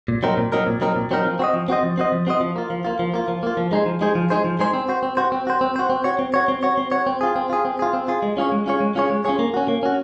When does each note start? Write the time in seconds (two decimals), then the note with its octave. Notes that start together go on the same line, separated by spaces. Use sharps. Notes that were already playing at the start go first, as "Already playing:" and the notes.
0.08 A#2
0.23 F#3 C4 D#4 A#4
0.37 A#2
0.52 F#3 C4 D#4 A#4
0.67 A#2
0.81 F#3 C4 D#4 A#4
0.96 A#2
1.11 F#3 C4 D#4 A#4
1.24 F3
1.39 C4 F#4 C5 D#5
1.54 F3
1.68 C4 F#4 C5 D#5
1.83 F3
1.98 C4 F#4 C5 D#5
2.12 F3
2.27 C4 F#4 C5 D#5
2.41 F3
2.56 A#3 F4
2.70 F3
2.85 A#3 F4
2.99 F3
3.14 A#3 F4
3.28 F3
3.43 A#3 F4
3.57 F3
3.72 G#3 D#4 G#4 C5
3.86 F3
4.01 G#3 D#4 G#4 C5
4.15 F3
4.30 G#3 D#4 G#4 C5
4.45 F3
4.59 G#3 D#4 G#4 C5
4.74 C4
4.89 F#4 C5
5.03 C4
5.17 F#4 C5
5.32 C4
5.47 F#4 C5
5.61 C4
5.76 F#4 C5
5.90 C4
6.04 F#4 C#5
6.19 C4
6.34 F#4 C#5
6.48 C4
6.63 F#4 C#5
6.78 C4
6.92 F#4 C#5
7.07 C4
7.21 F4 G#4
7.36 C4
7.50 F4 G#4
7.65 C4
7.79 F4 G#4
7.93 C4
8.08 F4 G#4
8.23 G#3
8.37 C#4 F4 G#4 C#5
8.52 G#3
8.66 C#4 F4 G#4 C#5
8.81 G#3
8.95 C#4 F4 G#4 C#5
9.10 G#3
9.25 C#4 F4 G#4 C#5
9.39 A#3
9.54 C#4 F#4
9.68 A#3
9.83 C#4 F#4